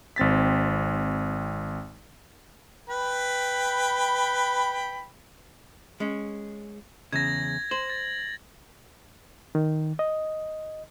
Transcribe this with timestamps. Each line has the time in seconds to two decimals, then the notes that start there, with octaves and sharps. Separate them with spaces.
0.16 G#1 C4 A6 B6
2.90 B4 G5 B5
6.00 G#3 C#4
7.13 E2 C#3 G#6 A#6
7.71 C5 F#7
7.90 A6
9.55 D#3
9.99 D#5